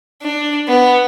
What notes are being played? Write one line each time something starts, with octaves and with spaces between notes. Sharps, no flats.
D4
B3